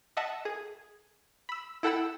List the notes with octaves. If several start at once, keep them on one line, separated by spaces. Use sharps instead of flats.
D#5 E5 F#5 A5
G#4
B5 E6
E4 A4 F#5 G5 B5 E6